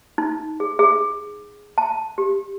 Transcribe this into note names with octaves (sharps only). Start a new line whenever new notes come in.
D#4
G#4
G#4
A5
G4